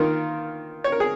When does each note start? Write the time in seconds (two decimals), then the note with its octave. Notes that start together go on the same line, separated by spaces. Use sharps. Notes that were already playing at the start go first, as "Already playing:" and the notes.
Already playing: D#3 A#3 F4 A#4
0.84 C#5
0.92 A#4
1.00 G#4